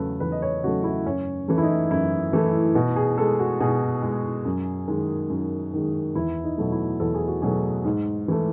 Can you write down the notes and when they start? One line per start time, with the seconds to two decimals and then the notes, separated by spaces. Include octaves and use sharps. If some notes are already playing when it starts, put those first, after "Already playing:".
Already playing: E2 C#3 F#3 A3 A4 B4
0.20 E2 B4
0.32 D#5
0.42 C#5
0.63 C#3 F#3 A3 F#4
0.84 E4
1.06 F#2 C#4
1.48 E3 A3
1.58 E4
1.63 D#4
1.91 F#2 E4
2.33 E3 A3
2.75 B2
2.96 G#4
3.18 G#3 A4
3.40 F#4
3.60 B2 G#4
4.02 G#3
4.45 F#2
4.88 D#3 G#3
5.30 F#2
5.73 D#3 G#3
6.15 E2 E4
6.44 D#4
6.58 B2 F#3 A3
6.72 E4
7.00 E2 A4
7.14 G#4
7.28 F#4
7.42 B2 F#3 A3 G#4
7.85 G#2
8.28 E3 A3